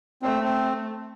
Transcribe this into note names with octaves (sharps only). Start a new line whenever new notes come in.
A3 C4
C4